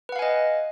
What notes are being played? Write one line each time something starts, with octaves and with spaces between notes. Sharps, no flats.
B4 D#5 F5 F#5 G#5